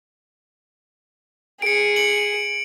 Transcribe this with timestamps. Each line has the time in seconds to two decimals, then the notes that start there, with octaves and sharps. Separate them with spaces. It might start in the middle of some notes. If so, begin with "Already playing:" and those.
1.62 G#4 C#7 D7
1.96 C#7 D7 F#7